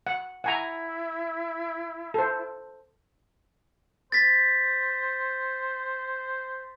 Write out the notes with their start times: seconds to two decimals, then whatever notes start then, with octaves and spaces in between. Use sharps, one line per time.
0.07 F#5
0.44 E4 F#5 G#5 A#5
2.14 A4 C5
4.12 C5 A6 B6